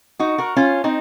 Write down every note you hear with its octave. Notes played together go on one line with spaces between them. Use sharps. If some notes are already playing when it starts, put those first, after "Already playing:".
D#4 F#4
F#4 A#4
C#4 F4
C4 D#4